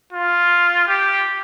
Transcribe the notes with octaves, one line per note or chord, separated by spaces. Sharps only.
F4
G4